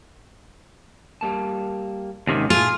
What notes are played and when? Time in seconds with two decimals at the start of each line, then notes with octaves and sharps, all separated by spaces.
1.21 G3 A#3 A5
2.27 D#2 G#2 C3 D#3 C#4
2.50 A#2 A3 F4 G#4